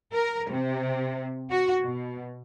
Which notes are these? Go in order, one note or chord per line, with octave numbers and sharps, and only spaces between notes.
A#4
C3
F#4
B2